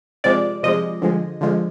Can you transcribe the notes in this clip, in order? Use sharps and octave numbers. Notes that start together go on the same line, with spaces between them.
C3 F3 G#3 D5
C3 F3 G#3 D#5
D3 F3 G#3
D3 F3 G#3